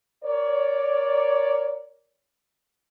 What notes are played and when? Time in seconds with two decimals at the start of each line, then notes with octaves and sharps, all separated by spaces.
0.24 A#4 C#5 D5